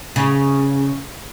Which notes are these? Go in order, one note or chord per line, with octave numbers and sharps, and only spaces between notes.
C#3